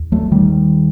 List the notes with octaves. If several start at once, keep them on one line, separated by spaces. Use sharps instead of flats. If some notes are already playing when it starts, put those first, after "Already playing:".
Already playing: D#2
F#3 A3
D#3 G3